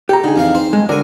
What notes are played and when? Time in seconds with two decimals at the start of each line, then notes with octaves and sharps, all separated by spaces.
0.09 G4 A4 A#5
0.24 D3 D#4 G#4
0.36 F2 E3 F5
0.55 C4 C5
0.73 G2 G#3
0.89 D3 F#4 A#4 D5 G#5